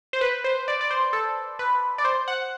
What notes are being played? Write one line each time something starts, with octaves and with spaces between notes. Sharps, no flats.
C5
B4
C5
D5
D5
C5
A4
B4
D5
C5
F#5